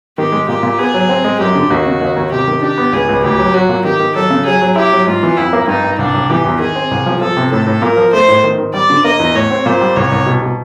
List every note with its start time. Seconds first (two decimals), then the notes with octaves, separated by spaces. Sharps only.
0.17 D#3 G4
0.32 G#3
0.48 A#2 G4
0.63 A#2
0.79 B3 G#4
0.94 F#3
1.09 C4
1.24 G#3
1.40 F#2 G4
1.55 D3
1.70 D#2 F#4
1.86 C#3
2.01 D#2
2.17 D#2
2.31 C3 G4
2.48 D#3
2.62 D4 G4
2.78 B3
2.93 C#2 G#4
3.09 C#2
3.23 D2 G4
3.39 F#3
3.54 F#3 F#4
3.69 A#2
3.85 D#3 G4
4.00 D#3
4.15 F#3 A4
4.30 C#3
4.46 F#3 G#4
4.61 F#3
4.76 E4 G4
4.92 F#3
5.07 G#2 F4
5.23 E3
5.37 F2 E4
5.53 A#3
5.68 G2 D#4
5.84 G2
5.99 C2 D4
6.14 C2
6.30 E3 G4
6.45 E2
6.59 D#3 G#4
6.75 C4
6.91 C2
7.06 F3
7.21 F3 A4
7.37 C3
7.52 A2 A4
7.66 A2
7.82 A#2 A#4
7.97 F3
8.13 A3 C5
8.28 A2
8.44 D#3
8.58 D#3
8.74 G3 D5
8.90 D3
9.04 A#3 D#5
9.20 E2
9.35 A2 C#5
9.51 C4
9.66 A#2 C5
9.81 G3
9.96 C2 C#5
10.12 C2
10.26 B2
10.42 B2